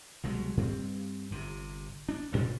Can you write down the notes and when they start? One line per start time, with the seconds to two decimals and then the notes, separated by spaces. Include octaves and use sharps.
0.23 C2 B2 F#3 G#3
0.57 G2 C4
1.32 G1 C3
2.09 D4
2.32 A1 G2 A#2 C#3